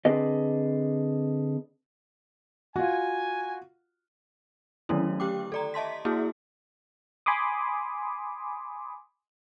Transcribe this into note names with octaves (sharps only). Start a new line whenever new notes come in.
D3 C4 G#4 B4 D5 D#5
F4 F#4 G#5
D3 D#3 F#3 A3 C#4 E4
G4 G5 D6
A4 D5 A#5
D#5 E5 A5 C6 B6
A#3 E4 F#4 G#4
G#5 B5 C6 D6 D#6